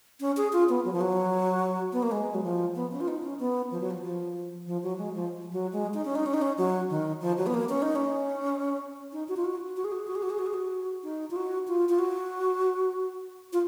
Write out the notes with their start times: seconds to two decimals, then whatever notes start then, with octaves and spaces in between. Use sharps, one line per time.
0.20 C#4
0.37 G#4
0.53 F4
0.69 B3
0.85 F#3
0.93 F3
1.01 F#3
1.92 B3
2.03 A#3
2.11 G#3
2.34 F#3
2.44 F3
2.76 B3
2.91 C#4
3.01 F4
3.08 D#4
3.23 C#4
3.40 B3
3.71 F3
3.80 F#3
3.91 F3
4.03 F3
4.66 F3
4.83 F#3
4.98 G#3
5.14 F3
5.52 F#3
5.73 G#3
5.94 D#4
6.05 C#4
6.15 D#4
6.26 C#4
6.34 D#4
6.42 C#4
6.58 F#3
6.90 D#3
7.21 F3
7.37 F#3
7.46 B3
7.54 A#3
7.69 C#4
7.82 D#4
7.95 C#4
9.13 D#4
9.29 F#4
9.37 F4
9.45 F#4
9.77 F#4
9.84 G#4
9.92 F#4
9.99 G#4
10.08 F#4
10.15 G#4
10.23 F#4
10.30 G#4
10.39 F#4
10.46 G#4
10.54 F#4
11.03 D#4
11.31 F4
11.36 F#4
11.68 F4
11.89 F4
11.99 F#4
13.53 F4